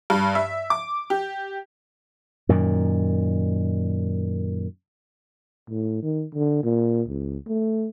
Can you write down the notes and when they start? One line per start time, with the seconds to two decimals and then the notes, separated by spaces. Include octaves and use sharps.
0.10 G2
0.35 E5
0.70 D6
1.10 G4
2.49 F#2 A#2 D#3
5.70 A2
6.03 D#3
6.35 D3
6.63 A#2
7.08 C#2
7.47 A3